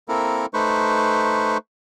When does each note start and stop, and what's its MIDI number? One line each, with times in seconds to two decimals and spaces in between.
0.08 0.46 58
0.08 0.46 60
0.08 0.46 64
0.08 0.46 69
0.08 0.46 70
0.54 1.57 57
0.54 1.57 63
0.54 1.57 71
0.54 1.57 72
0.54 1.57 85